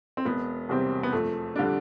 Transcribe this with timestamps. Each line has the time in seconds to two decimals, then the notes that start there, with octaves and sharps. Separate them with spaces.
0.17 C4
0.25 E1 B3
0.69 E2 C3 G3 C4
1.03 B3
1.12 F2 A3
1.56 D3 G3 D4